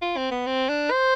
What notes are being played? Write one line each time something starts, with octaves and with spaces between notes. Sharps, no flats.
F4
C4
B3
C4
D4
C5